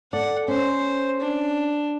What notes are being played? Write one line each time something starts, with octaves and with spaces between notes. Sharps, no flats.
A4 D5 F#5
C#4 C5
D4